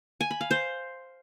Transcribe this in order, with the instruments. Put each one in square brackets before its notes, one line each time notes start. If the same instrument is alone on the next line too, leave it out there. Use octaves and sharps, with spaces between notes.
[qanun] G#5
B5
F5
C5